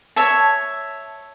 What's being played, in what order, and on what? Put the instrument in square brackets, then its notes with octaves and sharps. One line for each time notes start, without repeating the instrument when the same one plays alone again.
[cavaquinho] C#5 E5 A5